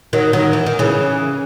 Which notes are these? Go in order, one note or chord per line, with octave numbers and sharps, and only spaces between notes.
D#3 F#3
D#3 F#3
E3
D#3
C#3 E3